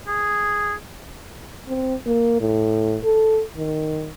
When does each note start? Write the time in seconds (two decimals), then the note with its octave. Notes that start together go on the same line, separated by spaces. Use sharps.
0.08 G#4
1.68 C4
2.06 A#3
2.41 A2
3.03 A4
3.57 D#3